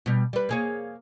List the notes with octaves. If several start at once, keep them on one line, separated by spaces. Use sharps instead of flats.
B2 G3
G3 B4
A#3 G#4 C#5